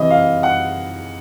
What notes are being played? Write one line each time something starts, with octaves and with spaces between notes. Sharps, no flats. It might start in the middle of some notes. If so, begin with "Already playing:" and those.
Already playing: C3 E3 D#5
F5
F#5